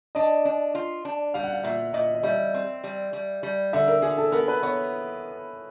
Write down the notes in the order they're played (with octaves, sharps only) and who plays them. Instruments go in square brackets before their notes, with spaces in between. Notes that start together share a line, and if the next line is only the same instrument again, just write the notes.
[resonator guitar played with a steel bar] D4 [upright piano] D#5
[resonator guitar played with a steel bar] D4
F4
D4
[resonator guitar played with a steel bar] G3 [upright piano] F5
[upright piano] F#5
F5
[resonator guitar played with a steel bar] A#2 [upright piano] E5
[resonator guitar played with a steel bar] A#2 [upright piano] D#5
[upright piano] D#5
[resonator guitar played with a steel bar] G3 [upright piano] E5
[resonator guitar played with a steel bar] C4
G3
G3
G3
[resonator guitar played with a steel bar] D3 [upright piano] E5
[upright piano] A#4
[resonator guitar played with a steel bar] D3 [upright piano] G#4
[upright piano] A4
[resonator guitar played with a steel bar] B3 [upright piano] A#4
[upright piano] B4
[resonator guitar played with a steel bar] B3 [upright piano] C#5